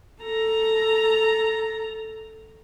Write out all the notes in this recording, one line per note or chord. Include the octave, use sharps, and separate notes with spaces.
A4 A#5